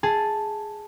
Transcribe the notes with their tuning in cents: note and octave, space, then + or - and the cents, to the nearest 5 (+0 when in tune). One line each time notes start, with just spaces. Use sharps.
G#4 +0 A5 +0